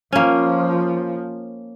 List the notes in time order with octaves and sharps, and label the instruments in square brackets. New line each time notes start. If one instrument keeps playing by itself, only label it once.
[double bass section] F3 [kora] A#3 C#4